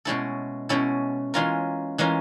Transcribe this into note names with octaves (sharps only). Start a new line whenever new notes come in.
B2 G#3 C#4 E4 A4
B2 G#3 C#4 E4 A4
E3 G#3 C#4 F4 A#4
E3 G#3 C#4 F4 A#4